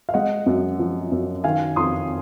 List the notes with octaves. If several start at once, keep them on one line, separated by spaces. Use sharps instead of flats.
F5
G#3 D#5 F#5
F#2
F3
F#2
D#3 F5 G#5
F2 C6 D#6